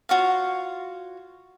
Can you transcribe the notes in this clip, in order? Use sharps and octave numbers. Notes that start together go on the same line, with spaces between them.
F4 F#4 C#5 F5